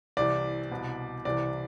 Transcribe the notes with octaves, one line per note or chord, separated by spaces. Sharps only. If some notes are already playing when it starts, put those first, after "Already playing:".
C2 C3 E3 D5
C2 B2
C2 C3 E3 D5